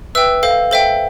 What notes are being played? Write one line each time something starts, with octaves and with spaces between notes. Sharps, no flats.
B4 E5 G5 E6
A4 C5 F5
A4 C5 E5 G5